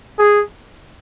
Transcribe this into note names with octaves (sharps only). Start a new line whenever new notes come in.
G#4